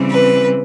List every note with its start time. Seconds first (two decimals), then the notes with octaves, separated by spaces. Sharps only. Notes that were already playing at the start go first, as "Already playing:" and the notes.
Already playing: C#3 E3 G3 C4
0.10 B4